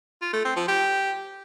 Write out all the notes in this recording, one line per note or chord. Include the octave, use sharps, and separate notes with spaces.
F4
A3
C4
F3
G4